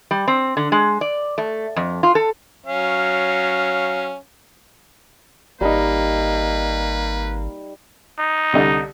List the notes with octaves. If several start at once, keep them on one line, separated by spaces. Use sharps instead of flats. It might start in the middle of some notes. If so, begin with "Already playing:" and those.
G3
C4
D3
G#3
D5
A3
F2
F4
A4
F#3 C#4 F5
G#1 G3 A#3 D#4 B4
D#4
C2 D3 D#5